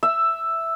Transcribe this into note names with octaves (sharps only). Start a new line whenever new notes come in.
E5